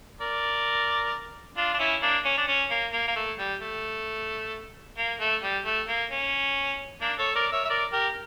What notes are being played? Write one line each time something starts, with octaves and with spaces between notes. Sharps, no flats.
A#4 D5
D4 F4
D4
C#4 E4
A#3 D4
C#4
D4
C#4
A#3
A#3
A#3
A3
G3
A3
A#3
A3
G3
A3
A#3
C#4
A#3 D4
A4 C#5
A#4 D5
C#5 E5
E5
A#4 D5
G4 A#4